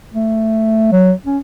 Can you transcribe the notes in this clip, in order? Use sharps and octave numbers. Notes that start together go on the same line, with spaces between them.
A3
F#3
C#4